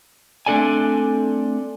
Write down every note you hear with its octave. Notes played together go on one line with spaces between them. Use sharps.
A3 C4 D4 A4 D5 G#5